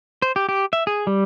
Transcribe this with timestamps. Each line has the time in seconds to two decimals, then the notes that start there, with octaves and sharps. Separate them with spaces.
0.22 C5
0.36 G4
0.49 G4
0.73 E5
0.87 G#4
1.07 G3